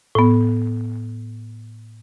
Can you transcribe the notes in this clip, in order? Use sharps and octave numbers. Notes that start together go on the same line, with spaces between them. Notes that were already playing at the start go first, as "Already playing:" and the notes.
A2 B3